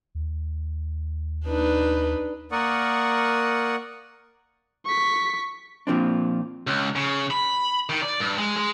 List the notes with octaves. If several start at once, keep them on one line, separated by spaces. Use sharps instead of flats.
D#2
D4 D#4 B4
A#3 A#4 D5 F#5 C#6 D#6
C#6 B6
A#2 F3 C4 D4
C#2
C#3
B5
D#3
D5
G2
G#3
G#3